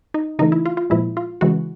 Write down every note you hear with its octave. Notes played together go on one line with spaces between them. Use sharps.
D#4
C#3 E3 A3 D#4
E4
F4
F4
A#2 F3 G#3 E4
F4
C#3 E3 G#3 F#4